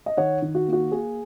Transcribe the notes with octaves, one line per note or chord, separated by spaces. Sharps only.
D#5
D#3 C#5 F#5
D#3
F#4
A#3
F#4
A#3 G#4